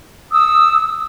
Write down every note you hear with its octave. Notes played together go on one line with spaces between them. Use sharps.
D#6 E6